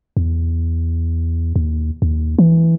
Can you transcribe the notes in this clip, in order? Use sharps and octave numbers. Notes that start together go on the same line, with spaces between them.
E2
D#2
D#2
E3